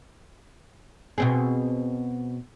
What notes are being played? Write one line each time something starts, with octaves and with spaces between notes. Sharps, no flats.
B2 C4 G#4